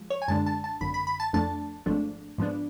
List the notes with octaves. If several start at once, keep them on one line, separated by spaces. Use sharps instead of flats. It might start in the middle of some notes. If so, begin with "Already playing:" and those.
Already playing: F3 G#3
C#5
G#5
F#2 D3 G#3 D4 A5
A5
A5
G#1 F#2 D3 B5
B5
B5
A5
F2 F3 A3 D4 A5
G#1 G#2 F3 A3 D4
G#2 F3 B3 D4